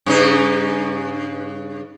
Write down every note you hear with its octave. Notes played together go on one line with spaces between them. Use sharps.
G2 C#3 D#4